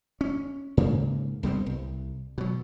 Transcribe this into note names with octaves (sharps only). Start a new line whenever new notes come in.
C#4
G#2 C#3 A#3
C2 G3 B3 C4
C2
B2 F#3